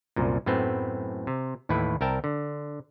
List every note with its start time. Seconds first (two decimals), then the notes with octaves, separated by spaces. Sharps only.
0.16 C2 F#2 A#2
0.46 F#2 A2 A3 B3 C4
1.27 C3
1.69 D#2 A2 E3 E4 B4
2.01 C2 A#4 E5 G5 A5
2.24 D3